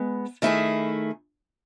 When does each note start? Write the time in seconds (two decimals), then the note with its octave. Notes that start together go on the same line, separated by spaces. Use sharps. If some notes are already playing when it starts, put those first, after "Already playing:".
Already playing: G#3 B3
0.42 D#3 A3 E4 G#4